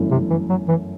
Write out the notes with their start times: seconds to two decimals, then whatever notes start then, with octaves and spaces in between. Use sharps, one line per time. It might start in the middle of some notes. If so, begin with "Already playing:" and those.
Already playing: G1 F#2 E3 A3 E4
0.11 C3
0.30 E3
0.49 F#3
0.69 E3